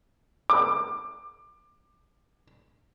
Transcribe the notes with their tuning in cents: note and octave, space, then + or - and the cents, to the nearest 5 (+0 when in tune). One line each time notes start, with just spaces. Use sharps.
D6 +20